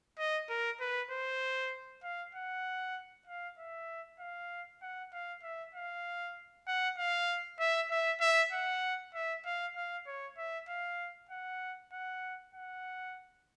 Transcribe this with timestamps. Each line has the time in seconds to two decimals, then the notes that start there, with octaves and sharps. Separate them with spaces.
0.19 D#5
0.49 A#4
0.80 B4
1.11 C5
2.03 F5
2.35 F#5
3.27 F5
3.58 E5
4.20 F5
4.82 F#5
5.13 F5
5.43 E5
5.75 F5
6.67 F#5
6.98 F5
7.60 E5
7.90 E5
8.21 E5
8.52 F#5
9.14 E5
9.45 F5
9.76 F5
10.07 C#5
10.38 E5
10.69 F5
11.30 F#5
11.93 F#5
12.54 F#5